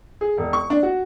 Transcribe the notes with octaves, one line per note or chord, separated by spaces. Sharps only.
G#4
E1
C#6
D4
F#4